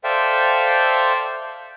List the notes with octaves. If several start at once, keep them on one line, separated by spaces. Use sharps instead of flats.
A4 C5 D5 E5 F5 G5